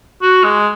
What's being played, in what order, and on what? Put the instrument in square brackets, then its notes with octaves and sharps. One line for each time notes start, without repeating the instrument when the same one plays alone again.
[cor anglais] F#4
G#3